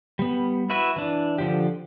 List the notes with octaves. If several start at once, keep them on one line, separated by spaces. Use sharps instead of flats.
G3 B3
E4 F#4 B4 E5
E3 D4
D3 F3 G4